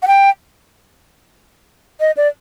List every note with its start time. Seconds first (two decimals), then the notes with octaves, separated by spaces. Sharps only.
0.02 F#5
0.07 G5
2.00 D#5
2.17 D5